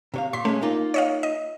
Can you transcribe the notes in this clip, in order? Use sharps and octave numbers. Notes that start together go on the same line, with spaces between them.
C3 C#5 F5
A#2 C6 B6
G#3 A3 C#4
A#3 D#4 F4
C#5 D#5 F5
D#5